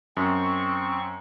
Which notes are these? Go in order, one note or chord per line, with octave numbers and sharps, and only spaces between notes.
F#2 C4 C#6